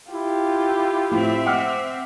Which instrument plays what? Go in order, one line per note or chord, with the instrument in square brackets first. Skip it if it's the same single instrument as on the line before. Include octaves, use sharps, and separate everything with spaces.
[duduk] E4 [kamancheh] F4 G4
[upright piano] A2 F3 [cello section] C4 E5
[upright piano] F#5 D6 F6